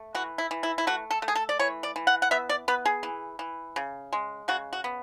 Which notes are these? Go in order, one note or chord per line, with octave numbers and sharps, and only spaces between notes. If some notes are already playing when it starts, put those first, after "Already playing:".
Already playing: A3
E3 F#4
E4
E3
E4
E4
A3 F#4
A4
A3
G#4
A4
D5
E3 C#5
D5
E3
F#5
F#5
B3 E5
D5
B3 B4
G#4
E3
E3
C#3
G#3
C#3 F#4
F#4
B3